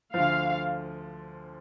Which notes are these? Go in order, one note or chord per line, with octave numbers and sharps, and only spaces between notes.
D2 D3 F3 F5